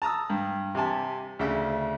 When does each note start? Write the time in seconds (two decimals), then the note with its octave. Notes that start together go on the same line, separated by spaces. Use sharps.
0.02 A5 A#5 D#6 E6
0.30 G2
0.75 C3 G4 G#5 A5
1.39 D2 C#3 D4 E5